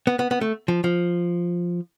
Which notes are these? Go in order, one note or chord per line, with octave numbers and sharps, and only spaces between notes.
B3
B3
B3
A3
F3
F3